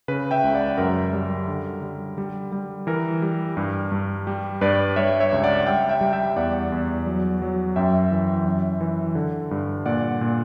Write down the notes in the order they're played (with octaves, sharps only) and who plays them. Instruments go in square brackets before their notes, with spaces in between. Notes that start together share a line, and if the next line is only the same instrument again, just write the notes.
[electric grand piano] C#3 B4
E5 G5
C#2
D5 F#5
F#2 A#4
G3
D3
G3
G3
G3
E3 A#4
G3
G2
G2
G3
G2 B4 D5
G3 C#5 E5
C#5 E5
C#2
D5 F#5
G3 E5 G5
E5 G5
G3
E5 G5
E2 D5 F#5
E2
F#3
F#3
F#2 E5 G5
E3
F#2
E3
D3
G2
A#2 D5 F#5
A#2